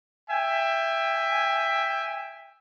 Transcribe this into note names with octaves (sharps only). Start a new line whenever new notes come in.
E5 G5 G#5